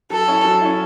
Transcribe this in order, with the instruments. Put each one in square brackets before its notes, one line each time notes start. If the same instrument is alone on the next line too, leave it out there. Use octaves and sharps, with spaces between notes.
[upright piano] F#3 [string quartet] A4
[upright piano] C#4 E4
F#3
C#4 E4